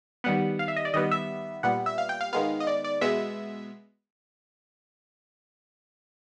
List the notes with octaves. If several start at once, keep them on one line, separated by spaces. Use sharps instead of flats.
D#3 G3 B3 F#5
F5
E5
D#5
D5
D#3 G3 B3 D#5
E5
A#2 G3 B3 F#5
E5
F5
G5
F5
D#3 G#3 B3 F5
D#5
D5
D5
B2 G#3 B3 E5